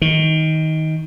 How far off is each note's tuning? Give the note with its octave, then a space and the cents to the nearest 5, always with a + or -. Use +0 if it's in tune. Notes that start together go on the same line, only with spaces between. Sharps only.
D#3 +20